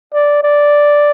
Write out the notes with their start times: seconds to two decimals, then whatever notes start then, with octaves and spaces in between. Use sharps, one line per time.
0.14 D5
0.43 D5